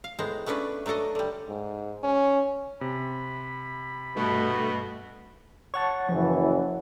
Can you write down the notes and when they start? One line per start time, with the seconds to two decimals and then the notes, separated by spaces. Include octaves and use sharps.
0.04 F5
0.19 A2 G#3 B3 C5 A#5
0.46 A3 B3 C#4 D4 B4
0.86 F#3 A3 D4 A4 D#5
1.15 D3 G3
1.48 G#2
2.03 C#4
2.81 C3 B5
4.16 G2 B2 A3
5.74 C#5 F#5 A5 C#6
6.09 F#1 E3 F3